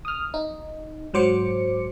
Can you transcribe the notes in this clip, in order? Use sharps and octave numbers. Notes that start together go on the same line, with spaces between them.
D#6 F6
D#4
G#2 F#3 C5 D6 C#7